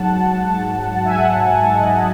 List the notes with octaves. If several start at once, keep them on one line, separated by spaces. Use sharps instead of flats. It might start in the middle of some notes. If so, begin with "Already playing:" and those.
Already playing: G#2 F#3 F#5 A5
E5 G#5
F#5
E5 G#5
E5 G#5
D#5 F#5